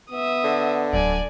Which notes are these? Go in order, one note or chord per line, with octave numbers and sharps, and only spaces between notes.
B3 E5 D#6
D3
D1 F#3 D5 G#5